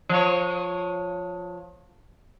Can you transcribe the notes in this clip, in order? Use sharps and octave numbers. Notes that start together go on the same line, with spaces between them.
F3 C#5